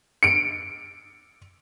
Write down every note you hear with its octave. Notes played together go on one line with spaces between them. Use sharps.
C#7 D7